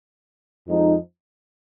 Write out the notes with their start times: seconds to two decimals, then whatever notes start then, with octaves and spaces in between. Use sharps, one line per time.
0.66 F2 F3 G#3 D#4